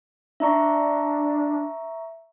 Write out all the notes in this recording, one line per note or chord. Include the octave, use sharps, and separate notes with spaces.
D4 E5 A#5 C#6